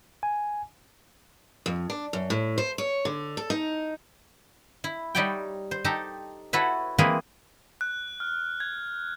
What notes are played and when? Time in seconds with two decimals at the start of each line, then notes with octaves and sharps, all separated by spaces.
0.23 G#5
1.66 F2
1.90 D4
2.13 F#2
2.30 A2
2.58 C5
2.78 C#5
3.05 D3
3.37 A4
3.50 D#4
4.84 E4
5.15 G3 D#4 C#5 D5 E5 G5
5.71 C5
5.84 D#4 G4 A4 A5 A#5
6.53 E4 F#4 A4 B4 C#5 E5
6.98 E3 G#3 A#3 C4 G#4 B4
7.81 F#6
8.20 F6
8.60 G#6